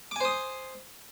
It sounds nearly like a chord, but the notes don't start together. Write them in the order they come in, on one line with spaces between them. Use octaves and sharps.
D6 G#5 C5 D#6